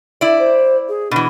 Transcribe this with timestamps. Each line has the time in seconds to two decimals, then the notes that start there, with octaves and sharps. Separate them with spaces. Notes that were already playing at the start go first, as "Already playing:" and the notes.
0.21 E4 D5
0.39 C5
0.88 G#4
1.11 B2 E3 D4